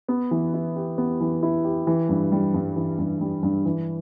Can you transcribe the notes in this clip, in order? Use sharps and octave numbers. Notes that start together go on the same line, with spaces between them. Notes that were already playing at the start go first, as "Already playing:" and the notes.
B3
E3
E4
G4
B3
E3
E4
G4
E3
G2
G3
G2
E3
G2
G3
G2
E3